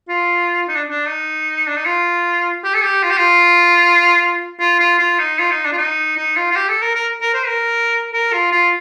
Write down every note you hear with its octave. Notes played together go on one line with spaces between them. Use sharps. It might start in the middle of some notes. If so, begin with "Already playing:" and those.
F4
D#4
D4
D4
D#4
D4
D#4
F4
G4
A4
G4
F4
G4
F4
F4
F4
F4
D#4
F4
D#4
D4
F4
D#4
D#4
F4
F4
G4
A4
A#4
A#4
A#4
C5
A#4
A#4
F4
F4